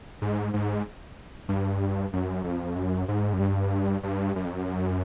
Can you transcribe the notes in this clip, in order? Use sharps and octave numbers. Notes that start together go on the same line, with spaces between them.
G#2
G#2
G2
F#2
F2
F#2
G#2
F#2
G2
G2
F#2
F2
F#2